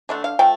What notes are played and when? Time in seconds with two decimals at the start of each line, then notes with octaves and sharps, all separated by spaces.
0.09 D3 A3 D4
0.24 F5
0.39 F3 A3 G5